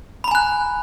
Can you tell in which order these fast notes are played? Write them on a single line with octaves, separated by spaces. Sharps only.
B5 A#5 G#5 F#6